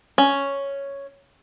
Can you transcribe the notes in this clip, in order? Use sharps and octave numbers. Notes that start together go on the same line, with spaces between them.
C#4